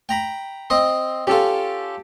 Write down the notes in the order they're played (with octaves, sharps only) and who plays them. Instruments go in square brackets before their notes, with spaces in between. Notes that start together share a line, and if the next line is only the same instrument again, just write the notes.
[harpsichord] G5 A#5 B5
C4 D#5 C6
[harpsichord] C#4 F4 [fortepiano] G4 A4